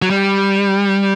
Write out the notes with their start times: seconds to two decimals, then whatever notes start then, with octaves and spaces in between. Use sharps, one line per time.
0.02 F#3
0.10 G3